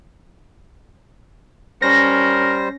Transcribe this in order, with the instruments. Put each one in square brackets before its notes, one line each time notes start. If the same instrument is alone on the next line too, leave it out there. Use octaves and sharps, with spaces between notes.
[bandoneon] G3 C5 [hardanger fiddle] C#4 [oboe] A#4 [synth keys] A#6